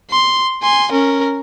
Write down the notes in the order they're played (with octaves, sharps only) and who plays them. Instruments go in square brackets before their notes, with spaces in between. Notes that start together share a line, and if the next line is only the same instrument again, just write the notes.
[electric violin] C6
G#5 C6
C#4 A#4